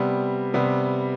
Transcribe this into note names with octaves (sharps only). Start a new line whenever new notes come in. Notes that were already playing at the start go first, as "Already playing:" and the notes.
Already playing: C3 G3 B3
C3 G3 B3